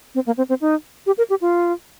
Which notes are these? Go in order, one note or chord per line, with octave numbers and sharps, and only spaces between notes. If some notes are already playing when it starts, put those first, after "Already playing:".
C4
A#3
C4
C4
D#4
G4
A#4
G4
F4